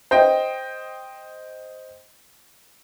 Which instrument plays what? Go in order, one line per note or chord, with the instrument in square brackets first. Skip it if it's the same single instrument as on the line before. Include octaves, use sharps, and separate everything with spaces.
[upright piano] C5 D#5 G5